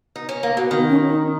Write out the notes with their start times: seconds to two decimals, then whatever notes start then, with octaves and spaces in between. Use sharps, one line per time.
0.16 D#4
0.29 C#4
0.43 A#3
0.57 B2
0.71 D#3 B3
0.89 C#4
1.07 D#4